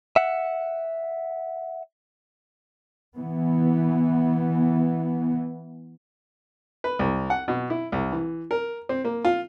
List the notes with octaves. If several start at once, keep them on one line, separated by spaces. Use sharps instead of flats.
E5 F#5
E3 B3
B4
C2
F#5
B2
E4
C2
E3
A#4
C4
A#3
F4